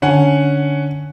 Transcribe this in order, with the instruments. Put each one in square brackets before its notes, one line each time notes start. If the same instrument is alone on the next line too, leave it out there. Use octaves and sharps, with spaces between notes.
[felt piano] D3 [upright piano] C#4 F#5 G#5